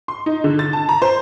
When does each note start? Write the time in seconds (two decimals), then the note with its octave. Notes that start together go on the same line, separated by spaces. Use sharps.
0.08 C6
0.26 D#4
0.44 D3
0.59 A6
0.73 A5
0.89 A#5
1.02 C5